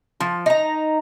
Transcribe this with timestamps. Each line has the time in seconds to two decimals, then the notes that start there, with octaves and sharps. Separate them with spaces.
0.20 F3
0.46 D#4 A#5